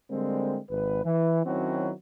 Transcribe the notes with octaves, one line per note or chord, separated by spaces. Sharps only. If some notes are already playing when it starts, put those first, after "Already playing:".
D3 G3 G#3 A#3 C4
G#1 B4
E3
D#3 F#3 C4 C#4 E4 F#4